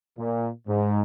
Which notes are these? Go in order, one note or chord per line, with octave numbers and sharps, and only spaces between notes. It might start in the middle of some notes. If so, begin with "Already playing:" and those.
A#2
G#2